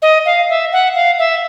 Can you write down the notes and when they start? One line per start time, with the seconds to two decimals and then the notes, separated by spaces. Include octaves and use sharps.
0.02 D#5
0.26 F5
0.49 E5
0.72 F#5
0.95 F5
1.19 E5